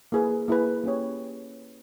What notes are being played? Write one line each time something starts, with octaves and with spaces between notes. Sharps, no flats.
A#3 E4 G#4 B4
A#3 E4 G#4 B4
A#3 C#4 G4 C#5